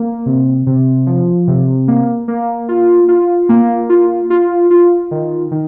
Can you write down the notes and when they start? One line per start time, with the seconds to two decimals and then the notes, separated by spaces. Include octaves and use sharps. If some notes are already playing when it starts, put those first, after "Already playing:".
Already playing: A#3
0.26 C3
0.67 C3
1.07 F3
1.48 C3
1.88 A#3
2.28 A#3
2.69 F4
3.08 F4
3.49 A#3
3.90 F4
4.30 F4
4.71 F4
5.11 D#3
5.51 D#3